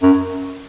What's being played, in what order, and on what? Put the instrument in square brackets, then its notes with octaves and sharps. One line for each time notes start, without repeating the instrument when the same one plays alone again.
[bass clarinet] F#2